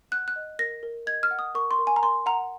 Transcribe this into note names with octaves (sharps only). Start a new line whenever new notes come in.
F#5 F#6
F#6
D#5
A#4 A#6
A#4
D#5 G#6
F6
F#5
D#6
A#4 C#6
C6
A#4
G#5
A#5
A#4 C6
F#5 A#5